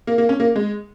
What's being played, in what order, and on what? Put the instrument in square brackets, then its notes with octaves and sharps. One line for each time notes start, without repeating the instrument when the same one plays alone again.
[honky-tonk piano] A#3
A#3
C#4
A#3
G#3